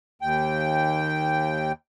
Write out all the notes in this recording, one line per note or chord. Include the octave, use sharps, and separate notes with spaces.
D#2 G5